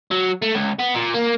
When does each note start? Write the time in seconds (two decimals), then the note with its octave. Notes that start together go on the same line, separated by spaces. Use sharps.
0.11 F#3
0.42 A3
0.55 C#2
0.79 B3
0.95 A#2
1.14 A#3